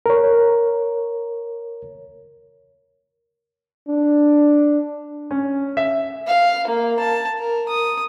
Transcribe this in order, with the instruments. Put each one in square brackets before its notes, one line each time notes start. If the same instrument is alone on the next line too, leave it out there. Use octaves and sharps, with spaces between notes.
[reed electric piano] A#4 C#5
[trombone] D4
[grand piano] C#4
E5
[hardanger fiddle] F5
A#3
A5
A#4
D#6